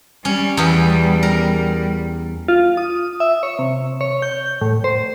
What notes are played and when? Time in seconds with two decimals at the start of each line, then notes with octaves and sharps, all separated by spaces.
0.25 G3 C#4
0.57 E2 B3
1.23 A#4
2.48 F4
2.77 D#6
3.20 E5
3.43 C#5
3.59 C3
4.01 C#5
4.22 G6
4.61 A2
4.84 C5